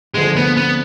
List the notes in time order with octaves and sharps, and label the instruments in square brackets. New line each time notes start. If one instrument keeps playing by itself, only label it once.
[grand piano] D2 D3 F3 [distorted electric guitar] G#3
[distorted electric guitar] B3
B3